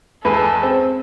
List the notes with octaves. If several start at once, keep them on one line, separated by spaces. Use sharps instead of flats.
E2 G#3 A4 B4
C4